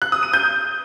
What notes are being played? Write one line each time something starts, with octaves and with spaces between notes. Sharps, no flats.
F#6
D#6
D#7
G6